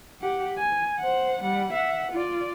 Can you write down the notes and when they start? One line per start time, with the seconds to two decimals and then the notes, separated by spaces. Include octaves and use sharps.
0.21 G4 F#5
0.58 G#5
1.00 C5 F#5
1.43 G3 F#5
1.73 E5 F#5
2.12 F4 D5